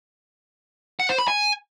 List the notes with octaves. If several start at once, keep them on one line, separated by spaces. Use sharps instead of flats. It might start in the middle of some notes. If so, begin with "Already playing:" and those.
F#5
C5
B5
G#5